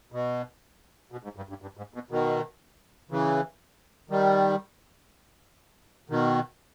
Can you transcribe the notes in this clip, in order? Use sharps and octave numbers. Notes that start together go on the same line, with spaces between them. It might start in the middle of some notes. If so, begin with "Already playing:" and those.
B2
B2
G#2
G2
G2
G2
G#2
B2
B2 D#3
C#3 E3
D#3 G3
B2 D#3